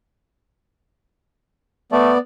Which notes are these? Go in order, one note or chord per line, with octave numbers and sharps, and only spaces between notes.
A3 B3 D5